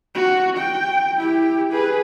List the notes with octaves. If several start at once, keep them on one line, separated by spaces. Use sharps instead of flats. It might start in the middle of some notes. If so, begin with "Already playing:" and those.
F#4
G5
E4 G4
G#4 B4